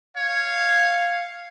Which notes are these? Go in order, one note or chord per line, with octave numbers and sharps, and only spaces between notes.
C#5 F5